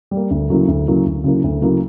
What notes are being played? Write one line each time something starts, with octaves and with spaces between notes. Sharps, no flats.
G3
A#3
D2
C#3 F#3 A#3 E4
D2
C#3 F#3 A#3 E4
D2
C#3 F#3 A#3 E4
D2
C#3 F#3 A#3 E4